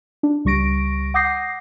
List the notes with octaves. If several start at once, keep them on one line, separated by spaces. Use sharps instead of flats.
D4
C#2 G3 C#6 A#6 D7
F#5 D6 D#6 G6 A#6 C7